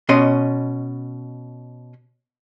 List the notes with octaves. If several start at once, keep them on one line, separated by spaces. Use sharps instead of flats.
B2 C#4 D#5 C6